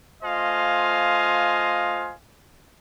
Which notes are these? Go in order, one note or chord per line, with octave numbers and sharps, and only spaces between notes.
A3 F4 C5 D#5 F5 G#5